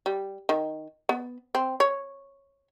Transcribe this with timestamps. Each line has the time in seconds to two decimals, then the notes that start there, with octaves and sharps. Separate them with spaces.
0.06 G3
0.49 D#3
1.09 B3
1.55 C4
1.80 C#5